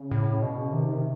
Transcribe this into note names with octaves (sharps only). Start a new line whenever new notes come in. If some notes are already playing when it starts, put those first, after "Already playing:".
Already playing: C#3
A2
B2
C3 D#3